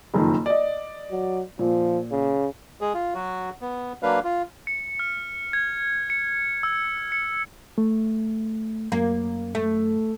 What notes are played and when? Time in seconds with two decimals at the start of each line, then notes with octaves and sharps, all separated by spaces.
0.14 F#1 F2 D#3
0.46 D5 D#5
1.11 F#3
1.59 A#2 F3
2.11 C#3
2.81 G#3 G#4
2.94 F4
3.14 F#3 F#4
3.61 B3
4.03 F#3 A#3 D4 B4 F5
4.24 F4
4.67 C#7
5.00 F6
5.53 G#6
6.10 C#7
6.63 E6
7.12 C#7
7.78 A3
8.92 F#2 A#3
9.55 A3